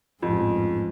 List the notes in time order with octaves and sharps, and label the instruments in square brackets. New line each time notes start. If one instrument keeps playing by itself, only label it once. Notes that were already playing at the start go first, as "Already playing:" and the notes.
[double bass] A1 G#2 [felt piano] F2